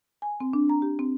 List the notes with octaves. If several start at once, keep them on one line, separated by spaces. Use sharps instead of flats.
G#5
C4
D4
A#5
G4
C4